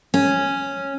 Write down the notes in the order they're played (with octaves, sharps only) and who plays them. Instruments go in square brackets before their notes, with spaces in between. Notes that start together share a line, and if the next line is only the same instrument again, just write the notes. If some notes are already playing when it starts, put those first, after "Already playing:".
[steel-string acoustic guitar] C#4